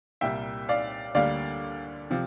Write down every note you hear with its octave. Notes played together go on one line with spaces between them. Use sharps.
C2 A#2 G3 A#3 E5 G5
D5 F5
D2 D3 G3 A#3 D5 F5
C3 F3